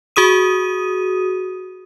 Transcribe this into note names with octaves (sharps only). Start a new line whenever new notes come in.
F#4 G#4 D#6 D#7